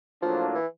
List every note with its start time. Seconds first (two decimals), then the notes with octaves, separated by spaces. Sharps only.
0.22 A2 F3 F#3 A#3 D4 F4
0.55 E3